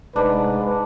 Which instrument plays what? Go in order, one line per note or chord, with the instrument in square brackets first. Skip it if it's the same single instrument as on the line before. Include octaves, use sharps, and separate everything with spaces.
[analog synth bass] F1 [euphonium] G#2 [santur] D4 [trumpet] B4